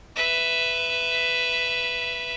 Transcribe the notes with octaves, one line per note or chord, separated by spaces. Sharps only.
B4 E5